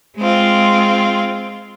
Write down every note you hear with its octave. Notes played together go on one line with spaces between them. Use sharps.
G#3 C4 F4